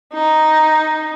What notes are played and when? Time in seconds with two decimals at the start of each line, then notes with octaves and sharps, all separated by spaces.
0.14 D#4